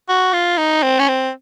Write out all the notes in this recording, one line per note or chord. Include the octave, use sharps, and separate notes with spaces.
F#4
F4
D#4
C4
C#4
C4